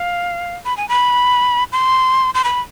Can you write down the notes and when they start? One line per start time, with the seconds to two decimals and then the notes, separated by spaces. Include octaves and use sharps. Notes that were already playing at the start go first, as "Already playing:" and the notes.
Already playing: F5
0.65 B5
0.77 G#5
0.89 B5
1.72 C6
2.34 C6
2.44 B5